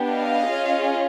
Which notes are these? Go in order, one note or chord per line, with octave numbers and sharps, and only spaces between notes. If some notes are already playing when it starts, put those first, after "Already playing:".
Already playing: B3 D4 G4
D#5 F5
C#4 F4 G#4